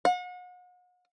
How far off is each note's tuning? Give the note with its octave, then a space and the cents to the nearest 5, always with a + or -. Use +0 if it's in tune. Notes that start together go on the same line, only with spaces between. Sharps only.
F#5 -40